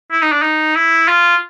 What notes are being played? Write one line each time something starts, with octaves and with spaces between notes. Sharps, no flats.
E4
D#4
D4
D#4
E4
F4